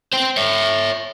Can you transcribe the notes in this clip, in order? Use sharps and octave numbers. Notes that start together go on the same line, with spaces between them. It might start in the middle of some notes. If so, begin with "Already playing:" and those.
C5 G5
C#5 E5